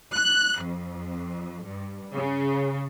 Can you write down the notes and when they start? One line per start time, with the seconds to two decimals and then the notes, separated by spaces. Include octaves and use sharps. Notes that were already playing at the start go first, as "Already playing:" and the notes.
0.15 F#6
0.63 F2
1.66 G2
2.15 C#3